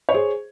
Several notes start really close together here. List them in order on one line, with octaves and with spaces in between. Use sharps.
C#5 C5 G#4